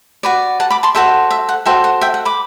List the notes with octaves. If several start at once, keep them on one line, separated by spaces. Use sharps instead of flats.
F#4 B4 D5
F#5 A5
B5 D6
A5 C6
F#4 A4 C5 E5
E5
F#5
F#4 A4 C5 E5 G5
F#5
E5 G5
F#5
B5 D6